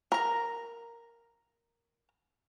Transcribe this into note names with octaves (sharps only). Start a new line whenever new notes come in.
A#4 A#5